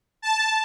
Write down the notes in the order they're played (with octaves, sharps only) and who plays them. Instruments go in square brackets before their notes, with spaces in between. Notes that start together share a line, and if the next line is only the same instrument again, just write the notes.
[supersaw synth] A5